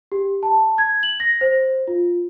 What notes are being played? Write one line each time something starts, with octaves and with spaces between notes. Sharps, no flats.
G4
A5
G#6
F#7
A#6
C5
F4